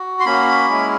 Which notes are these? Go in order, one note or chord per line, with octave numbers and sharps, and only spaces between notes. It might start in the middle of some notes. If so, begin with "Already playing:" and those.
Already playing: F#4
C6
A#3 C#4 F#4 B5
G#3 C#4 E4